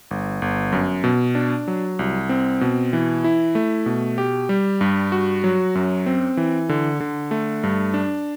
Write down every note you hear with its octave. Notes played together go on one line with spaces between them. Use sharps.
G1
G1
F#2
B2
D4
F#3
C2
C4
B2
E3
E4
A3
B2
G4
G3
G2
F#4
F#3
F#2
C4
E3
D3
D3
A3
G2
D4